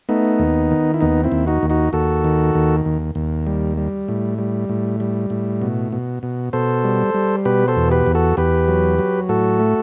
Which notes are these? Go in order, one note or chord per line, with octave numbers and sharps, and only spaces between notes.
A3 B3 D#4
D#2
D#3
E4
D#2 B3 D#4
C4 E4
D#2
D#4 F#4
D#2
D#4 F#4
D#2 F#4 A4
D#3
D#2
D#2
D#2
G3
G3
A2
G3
A2
G3
A2
B2
B2
B2
B2 A4 C5
G3
G3
B2 G4 B4
A4 C5
E2
G4 B4
E2
F#4 A4
E2 G4 B4
F#3
F#3
A2 F#4 A4
A3